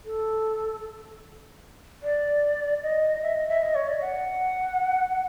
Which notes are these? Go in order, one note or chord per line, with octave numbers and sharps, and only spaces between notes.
A4
D5
D#5
E5
D#5
E5
D#5
C#5
D5
F#5